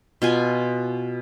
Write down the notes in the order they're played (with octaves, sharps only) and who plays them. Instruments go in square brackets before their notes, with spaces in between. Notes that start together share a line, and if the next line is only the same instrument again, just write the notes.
[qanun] B2 F4 G#5